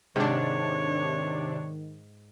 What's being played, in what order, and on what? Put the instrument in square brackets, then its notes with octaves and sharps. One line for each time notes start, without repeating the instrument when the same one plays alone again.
[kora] G#2 [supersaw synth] C3 D4 [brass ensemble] D#3 [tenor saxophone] C#5